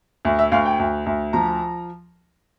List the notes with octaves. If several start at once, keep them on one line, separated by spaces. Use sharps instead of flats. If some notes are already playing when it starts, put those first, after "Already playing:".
D2
E5
D2 F5
G5
D2
D2
F3 A#5